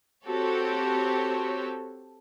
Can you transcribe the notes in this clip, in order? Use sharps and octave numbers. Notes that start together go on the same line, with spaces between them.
C4 F#4 G4 A4 C#5